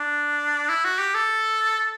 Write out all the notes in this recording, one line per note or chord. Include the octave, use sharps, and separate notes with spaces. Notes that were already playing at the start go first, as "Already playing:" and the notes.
Already playing: D4
E4
F#4
G4
A4